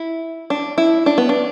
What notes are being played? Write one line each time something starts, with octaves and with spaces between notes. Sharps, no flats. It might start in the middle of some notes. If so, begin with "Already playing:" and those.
Already playing: E4
D4
E4
D4
B3
D4